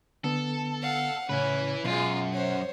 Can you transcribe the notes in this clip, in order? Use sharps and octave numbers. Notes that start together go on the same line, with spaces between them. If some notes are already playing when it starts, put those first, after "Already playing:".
D3 B3 A4
F5 F#5
A2 C#3 C#4 E4 B4
F#2 B2 G#3 F4
C5 C#5